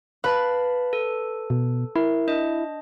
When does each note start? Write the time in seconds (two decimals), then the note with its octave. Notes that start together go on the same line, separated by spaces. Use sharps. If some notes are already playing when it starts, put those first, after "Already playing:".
0.24 B4 F5 A5 B5
0.93 A4
1.50 B2
1.96 E4 A#4
2.28 D4 D#5